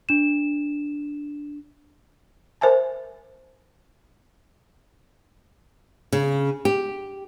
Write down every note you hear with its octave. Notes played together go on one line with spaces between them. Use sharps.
D4 E7
A#4 C5 E5 G#5 A5
C#3
G4